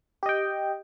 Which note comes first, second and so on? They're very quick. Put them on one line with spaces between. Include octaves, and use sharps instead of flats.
G4 D#5 G5